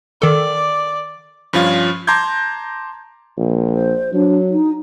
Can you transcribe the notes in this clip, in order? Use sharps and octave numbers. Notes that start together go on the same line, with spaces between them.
D#3 A4 D5
G2 F3 C#4 F4
A5 A#5 C6 D6 G6 G#6
A#1
C5
F#3 D4
D#4